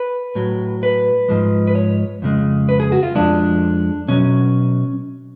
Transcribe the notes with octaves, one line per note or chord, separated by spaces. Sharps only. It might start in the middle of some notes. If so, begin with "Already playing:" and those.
Already playing: B4
A2 F#3
B4
G#2 F3 G#3
B4
C#5
F2 C#3 G#3
B4
G#4
F#4
F4
F2 F3 G#3 D4
B2 F#3 C#4